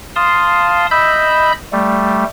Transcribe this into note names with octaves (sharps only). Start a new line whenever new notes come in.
F5 A5 C6 D#6
D#5 E5 B5 E6 G6
G3 A3